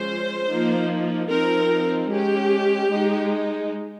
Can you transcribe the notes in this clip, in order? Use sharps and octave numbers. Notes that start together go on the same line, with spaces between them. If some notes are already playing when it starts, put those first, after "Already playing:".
Already playing: F3 G#3 C#4 C5
F3 A#3 D#4
F3 C4 D#4 A#4
G#3 C#4 G4
G#3 D#4